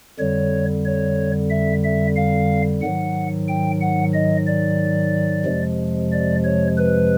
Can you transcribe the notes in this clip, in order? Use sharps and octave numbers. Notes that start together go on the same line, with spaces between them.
F2 D3 G3 C#5
C#5
E5
E5
F5
G#2 D#3 F#3 F#5
G5
F#5
D#5
D5
F2 C3 F3 G#3
D5
C#5
B4